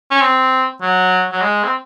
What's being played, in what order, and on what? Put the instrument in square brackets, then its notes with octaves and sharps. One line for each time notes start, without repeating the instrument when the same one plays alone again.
[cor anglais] C#4
C4
F#3
F#3
G#3
C4